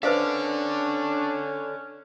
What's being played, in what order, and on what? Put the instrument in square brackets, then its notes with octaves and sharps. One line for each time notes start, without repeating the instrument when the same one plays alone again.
[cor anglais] C#4 [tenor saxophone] D4 [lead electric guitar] A4 D5 [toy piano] B4 C5 F5